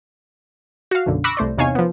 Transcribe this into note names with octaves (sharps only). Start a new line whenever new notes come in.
F#4 F5
B1 F#2 D3
B5 C#6 D6 E6 F#6 A#6
C2 A3 C5 D5
E2 C3 D#4 C#5 F5 G#5
F3 B3